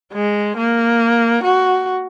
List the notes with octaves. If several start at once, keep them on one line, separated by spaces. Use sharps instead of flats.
G#3
A#3
F#4